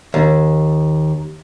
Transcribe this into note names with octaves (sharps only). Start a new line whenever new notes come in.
D#2